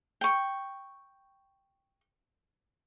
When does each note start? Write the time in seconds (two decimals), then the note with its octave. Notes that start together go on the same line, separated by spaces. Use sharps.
0.21 G5 C#6